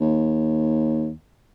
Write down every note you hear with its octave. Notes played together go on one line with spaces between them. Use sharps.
D#2